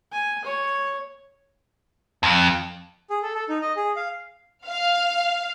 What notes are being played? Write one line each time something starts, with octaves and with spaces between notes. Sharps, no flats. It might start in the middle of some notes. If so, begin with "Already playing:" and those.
G#5
C#5
F2
G#4
A4
A4
D#4
D#5
G#4
F5
F5